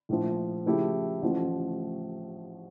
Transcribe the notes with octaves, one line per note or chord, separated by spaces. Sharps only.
A#1 A2 F3
C#3 F3 A3 E4 G4
A1 A2 F3 A3